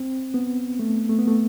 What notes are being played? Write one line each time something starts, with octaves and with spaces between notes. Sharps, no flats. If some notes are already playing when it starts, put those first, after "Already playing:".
Already playing: C4
B3
A3
A3
B3
A3